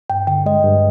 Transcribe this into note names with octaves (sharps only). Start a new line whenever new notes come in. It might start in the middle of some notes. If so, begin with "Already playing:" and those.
G2 G5
D3 G5
G#3 D#5
G2